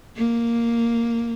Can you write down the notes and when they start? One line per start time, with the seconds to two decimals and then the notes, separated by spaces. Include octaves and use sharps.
0.17 A#3